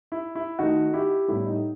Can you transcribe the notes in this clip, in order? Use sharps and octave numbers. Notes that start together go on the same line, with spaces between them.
E4
E4
D#3 A3 D#4 F#4
E4 G4
A2 G3 B3 E4
D#4